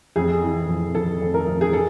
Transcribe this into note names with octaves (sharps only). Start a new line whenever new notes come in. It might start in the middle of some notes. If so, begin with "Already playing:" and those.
F2 G#4
E3
F2
F2 A4
F2
A#4
F2
G#4
A4